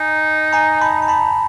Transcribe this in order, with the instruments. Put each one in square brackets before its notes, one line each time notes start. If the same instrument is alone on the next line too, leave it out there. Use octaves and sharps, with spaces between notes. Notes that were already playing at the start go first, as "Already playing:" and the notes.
Already playing: [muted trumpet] D#4 [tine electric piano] G#5 A#5
[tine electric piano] G#5 A#5
A5 B5
A#5
A5 B5